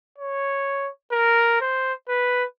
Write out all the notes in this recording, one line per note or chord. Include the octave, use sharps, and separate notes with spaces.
C#5
A#4
C5
B4